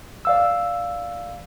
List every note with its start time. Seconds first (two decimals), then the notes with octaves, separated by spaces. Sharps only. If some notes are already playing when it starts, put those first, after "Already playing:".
0.25 D5 F5 E6